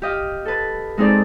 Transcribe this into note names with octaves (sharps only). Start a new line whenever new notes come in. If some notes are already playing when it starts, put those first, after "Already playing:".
G4 D#5 F5
A4 B4
G#3 C4 D#4 G#4 A4 D5